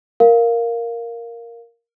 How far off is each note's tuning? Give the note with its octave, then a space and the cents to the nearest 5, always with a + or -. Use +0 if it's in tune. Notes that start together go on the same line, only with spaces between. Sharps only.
A#4 +0 F5 +0